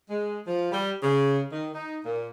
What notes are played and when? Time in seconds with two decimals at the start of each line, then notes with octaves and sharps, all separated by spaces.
0.10 G#3
0.47 F3
0.72 G3
1.03 C#3
1.52 D#3
1.74 D#4
2.05 A#2